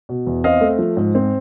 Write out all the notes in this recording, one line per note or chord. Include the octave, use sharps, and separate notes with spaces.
B2
E2
C4 D#5 F5
A3
F3
G#2
C4